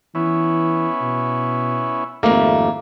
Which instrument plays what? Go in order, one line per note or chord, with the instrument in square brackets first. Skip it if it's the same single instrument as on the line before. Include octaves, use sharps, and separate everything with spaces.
[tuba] E3 [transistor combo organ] B3 C#4 E4
[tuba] B2
[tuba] G#1 [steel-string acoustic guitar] F2 G3 A3 [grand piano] A#3